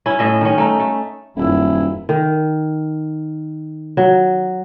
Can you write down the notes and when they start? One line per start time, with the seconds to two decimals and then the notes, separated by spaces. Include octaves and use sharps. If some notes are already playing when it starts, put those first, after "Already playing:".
0.06 C#4 E4
0.19 A2 D#5 E5
0.41 D#3 C#4
0.58 A3 D#4
0.80 A3
1.36 D#1 F#2 E4
2.09 D#3
3.97 F#3